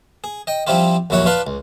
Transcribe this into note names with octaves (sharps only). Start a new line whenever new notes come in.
G#4
D#5 G5
F3 G3 C4 E4 F4 G4
A#1 D#2 F#3 E4 C#5 F#5
D4 F4 B4 F5 C6
C#2